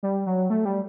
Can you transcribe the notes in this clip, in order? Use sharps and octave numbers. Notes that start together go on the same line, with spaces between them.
G3
F#3
A3
G3